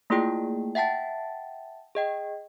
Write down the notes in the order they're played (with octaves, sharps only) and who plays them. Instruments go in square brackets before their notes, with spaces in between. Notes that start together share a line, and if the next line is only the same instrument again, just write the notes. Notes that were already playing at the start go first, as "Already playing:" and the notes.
[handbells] A3 A#3 E4 F4 G#4 G5
E5 F#5 G5 A5 A6
G#4 D#5 G5